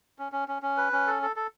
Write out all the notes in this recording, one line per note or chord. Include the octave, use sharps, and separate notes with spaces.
C#4
C#4
C#4
C#4
B4
C#4
A4
A4
A4